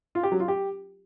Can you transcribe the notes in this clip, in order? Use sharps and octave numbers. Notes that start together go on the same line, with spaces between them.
F4
G4
F#3
F4
G4